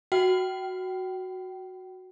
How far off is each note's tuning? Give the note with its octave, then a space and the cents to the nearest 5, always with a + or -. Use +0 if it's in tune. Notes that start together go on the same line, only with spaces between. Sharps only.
F#4 +0 G5 -30